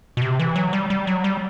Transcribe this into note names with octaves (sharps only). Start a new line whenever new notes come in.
B2
C3
E3
F#3
G3
G3
F#3
G3